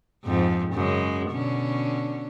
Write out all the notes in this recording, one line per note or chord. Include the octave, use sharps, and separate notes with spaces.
F2 G#2
F#2 C#3 G#3
B2 D3 C#4